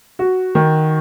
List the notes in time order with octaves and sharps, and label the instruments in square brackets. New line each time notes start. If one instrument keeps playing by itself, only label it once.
[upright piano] F#4
D#3